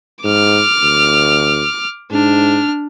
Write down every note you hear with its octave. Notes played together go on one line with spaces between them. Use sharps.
G#2 D6 F6
D2
G#2 D4 F6